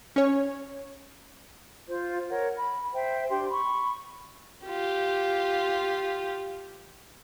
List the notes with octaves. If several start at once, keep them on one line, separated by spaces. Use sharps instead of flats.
C#4 C#5
F4 C5
A#4 C#5 F#5
B5
C5 E5 G5
D4 G4 G5 C6
B5 C#6
F4 G4